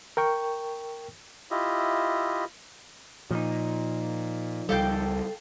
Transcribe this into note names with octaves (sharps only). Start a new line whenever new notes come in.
A#4 G5 C#6
E4 F4 G4 D#5 E5
A#2 F3 D#4
C#2 G3 A4 F5 G5